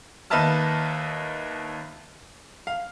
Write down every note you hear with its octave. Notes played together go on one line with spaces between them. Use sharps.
D#2 B4 D#5 E5 A5 F6
F5